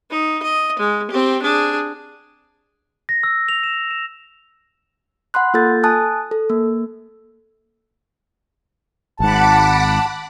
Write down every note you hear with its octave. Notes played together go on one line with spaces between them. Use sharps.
D#4
D#5
G#3
C4 G4
D4 G#4
A#6
E6
F7
E7
E7
F#5 B5 C6 F#6
A#3 F4 A4 G6 A6
A4
G#5 A5 D#6 F#6
A4
A#3
G#1 G#2 F#5 A5 B5 D6